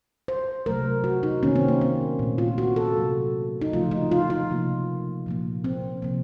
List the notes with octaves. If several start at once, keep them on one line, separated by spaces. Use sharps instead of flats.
C5
C3 F#3 A3 A#4
F#4
D#4
C3 D#3 A#3 C#4
C4
A#3
C4
A#2 A3
F4
F#4
A4
C3 F#3 A#3
D#4
C#3 F3 A3 F4
D#4
F4
F4
C3 F3 A#3
A#2 F3 A#3
C4
C3 F3 A#3